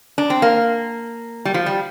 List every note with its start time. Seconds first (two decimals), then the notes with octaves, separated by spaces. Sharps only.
0.18 D4
0.30 C4
0.42 A#3
1.45 G3
1.54 F3
1.66 G3